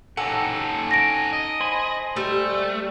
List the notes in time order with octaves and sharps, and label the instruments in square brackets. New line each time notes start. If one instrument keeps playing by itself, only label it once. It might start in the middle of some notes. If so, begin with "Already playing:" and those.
[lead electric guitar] C#4 G4 [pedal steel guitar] D#4 F#5 [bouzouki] A4
[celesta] A#6 D7
[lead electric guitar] D#5
[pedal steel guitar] C5 G#5 B5
[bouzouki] G3 [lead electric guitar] A3